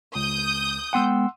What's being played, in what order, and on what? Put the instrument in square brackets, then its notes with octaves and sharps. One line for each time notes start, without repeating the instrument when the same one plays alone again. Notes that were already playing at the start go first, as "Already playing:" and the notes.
[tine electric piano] C#2 [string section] D#6 G6
[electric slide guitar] G#3 B3 G5 [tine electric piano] F#5 C6 E6